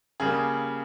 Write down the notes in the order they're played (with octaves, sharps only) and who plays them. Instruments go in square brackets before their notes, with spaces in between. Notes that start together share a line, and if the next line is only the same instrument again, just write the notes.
[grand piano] C#3 G3 A#3 G#4